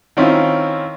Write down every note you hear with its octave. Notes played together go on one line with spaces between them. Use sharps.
D#3 C4 C#4 E4 F4